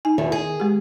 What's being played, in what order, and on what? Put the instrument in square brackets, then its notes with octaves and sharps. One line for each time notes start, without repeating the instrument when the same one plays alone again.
[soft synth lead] D#4 [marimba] G#5
[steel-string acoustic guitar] E2 B2 [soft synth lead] D#3
[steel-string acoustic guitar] G#4
[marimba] G#3 G4